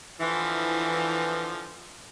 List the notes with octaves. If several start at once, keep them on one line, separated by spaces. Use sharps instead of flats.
D3 E3 F3